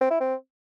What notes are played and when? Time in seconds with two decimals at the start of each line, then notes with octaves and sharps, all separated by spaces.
0.01 C4
0.11 E4
0.20 C4